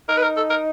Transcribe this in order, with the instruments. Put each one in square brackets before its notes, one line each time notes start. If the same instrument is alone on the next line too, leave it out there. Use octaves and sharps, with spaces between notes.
[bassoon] D#4 [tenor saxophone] A#4
[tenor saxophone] B4
A#4
A4
A#4